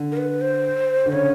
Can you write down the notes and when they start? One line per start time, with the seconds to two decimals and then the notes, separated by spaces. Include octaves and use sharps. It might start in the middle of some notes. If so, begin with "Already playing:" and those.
Already playing: D3
0.12 A#4
0.17 B4
0.41 C5
1.06 D3
1.12 C#3 C#5